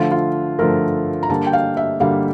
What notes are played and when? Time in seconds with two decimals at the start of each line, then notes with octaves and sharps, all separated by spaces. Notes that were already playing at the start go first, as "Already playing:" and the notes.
Already playing: D3 F3 A3 F4
0.12 F4
0.59 D3 F3 A3 A#4
1.23 A#5
1.30 D3 G3 A#3 A5
1.47 G5
1.53 F5
1.77 E5
2.00 D3 G3 A#3 F5